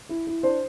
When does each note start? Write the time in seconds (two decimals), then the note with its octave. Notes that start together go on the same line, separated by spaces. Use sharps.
0.09 E4
0.27 E4
0.43 D4 C5